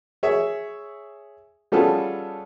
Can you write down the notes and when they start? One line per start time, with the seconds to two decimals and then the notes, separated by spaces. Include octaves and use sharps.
0.23 G#4 C#5 E5
1.72 G3 B3 C#4 F4 G#4 A4